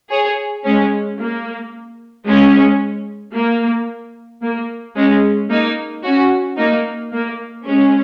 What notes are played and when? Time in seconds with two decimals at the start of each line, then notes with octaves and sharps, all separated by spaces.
0.10 G#4 C#5
0.65 G#3 C#4
1.19 A#3
2.26 G#3 C#4
3.34 A#3
4.42 A#3
4.96 G#3 C#4
5.49 A#3 D#4
6.03 C#4 F#4
6.57 A#3 D#4
7.12 A#3
7.65 G#3 C#4